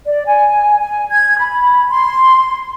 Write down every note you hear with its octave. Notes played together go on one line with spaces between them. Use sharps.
D5
G#5
G#5
G#6
B5
C6